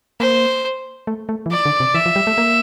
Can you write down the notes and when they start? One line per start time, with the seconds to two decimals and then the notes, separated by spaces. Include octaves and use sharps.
0.20 A#3 C5
1.07 A3
1.29 A3
1.46 E3
1.51 F3 D5
1.65 D3
1.80 C3
1.94 E3 E5
2.06 F3
2.16 G3
2.27 A3
2.38 A#3